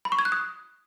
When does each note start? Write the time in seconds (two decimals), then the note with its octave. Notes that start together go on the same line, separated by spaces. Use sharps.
0.05 B5
0.12 C#6
0.19 G#6
0.25 F#6
0.32 D#6